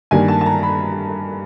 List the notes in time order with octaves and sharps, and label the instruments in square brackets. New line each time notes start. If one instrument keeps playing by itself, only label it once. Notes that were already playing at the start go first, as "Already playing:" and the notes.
[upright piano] G2 D#3 G3 A#3 G#5
A5
A5
A#5
B5